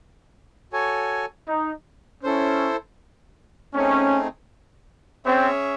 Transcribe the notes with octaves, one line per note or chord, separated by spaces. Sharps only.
F#4 A4 C#5 G#5
D#4
C#4 E4 A4 C5
A3 C4 C#4 D#4 G#4
C4 C#4 G#4 C#5 E5